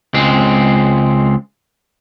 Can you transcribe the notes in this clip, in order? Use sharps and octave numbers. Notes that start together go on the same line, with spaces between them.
C#2 G#3 C4